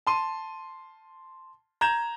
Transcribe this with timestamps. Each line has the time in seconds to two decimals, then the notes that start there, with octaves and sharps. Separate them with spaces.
0.07 A5 C6 D#7
1.81 A#5 G6 G#6 E7